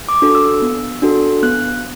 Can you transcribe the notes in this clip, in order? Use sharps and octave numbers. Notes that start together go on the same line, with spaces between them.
D6
D4 F#4 A4
E6
B3
D4 F#4 A4
B3 F#6